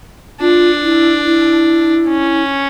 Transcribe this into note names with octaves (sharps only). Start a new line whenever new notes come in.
D4 F4
E4
E4
C#4